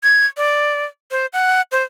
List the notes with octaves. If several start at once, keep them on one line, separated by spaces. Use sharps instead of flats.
G#6
D5
C5
F#5
C5